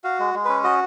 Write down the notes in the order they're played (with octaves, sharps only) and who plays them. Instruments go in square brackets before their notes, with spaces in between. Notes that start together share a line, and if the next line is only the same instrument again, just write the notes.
[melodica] F#4 F5
G#3
G#3
C#4 B4
F#4 D#5